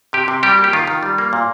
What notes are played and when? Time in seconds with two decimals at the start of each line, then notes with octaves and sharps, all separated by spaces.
0.13 C3 G4
0.28 C3
0.43 G3 G4
0.58 A#3
0.64 G4
0.73 D#3 F4
0.87 D#3
1.03 G3
1.18 A#3
1.33 A#2